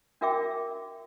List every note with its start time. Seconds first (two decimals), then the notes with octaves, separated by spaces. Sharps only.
0.21 D4 F#4 A#4 E5 G5 D6